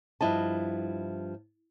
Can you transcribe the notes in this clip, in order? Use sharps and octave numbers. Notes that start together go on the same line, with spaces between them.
G2 F3 E4 D#5 A5